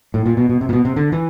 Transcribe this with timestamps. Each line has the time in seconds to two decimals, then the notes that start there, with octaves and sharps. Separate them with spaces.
0.14 A2
0.26 A#2
0.37 B2
0.49 B2
0.61 C3
0.69 A#2
0.73 B2
0.85 C3
0.96 D3
1.12 E3